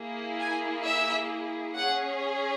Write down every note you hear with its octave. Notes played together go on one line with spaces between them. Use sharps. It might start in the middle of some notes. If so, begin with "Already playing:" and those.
Already playing: A#3 E4 G#4
G#5
E5
C#4 G#4 F#5